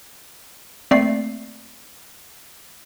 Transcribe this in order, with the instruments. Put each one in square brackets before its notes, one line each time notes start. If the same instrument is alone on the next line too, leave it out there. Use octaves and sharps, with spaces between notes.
[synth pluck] A3 A#3 C4 D5 C7